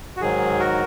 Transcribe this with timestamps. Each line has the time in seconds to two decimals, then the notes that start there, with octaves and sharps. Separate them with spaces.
0.16 F#4
0.21 G#2 D#3 F#3 G#4
0.59 F#4 A#4